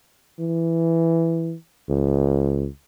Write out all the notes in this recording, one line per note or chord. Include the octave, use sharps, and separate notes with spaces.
E3
C#2